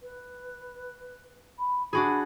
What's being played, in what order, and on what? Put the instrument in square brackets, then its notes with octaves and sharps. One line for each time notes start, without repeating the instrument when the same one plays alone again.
[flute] B4
B5
[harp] D4 F#4 G#4 [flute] B5